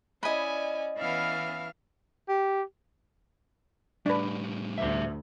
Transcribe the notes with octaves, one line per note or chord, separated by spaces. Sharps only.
C#4 E4 D5 D#5 G#5 B5
E3 B3 C#4 E5 F5 F6
G4
A2 G3 D4 B4
D2 C5 E5